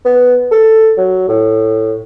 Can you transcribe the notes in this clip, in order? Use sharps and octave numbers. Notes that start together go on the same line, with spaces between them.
B3
A4
F#3
A2